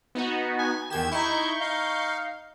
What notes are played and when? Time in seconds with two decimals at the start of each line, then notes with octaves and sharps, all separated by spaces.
0.15 B3 D#4 F#4
0.59 G#5
0.90 E2 D#3 G4 G#6 E7
1.11 D#4 E4 C#6 G6
1.60 D#4 F5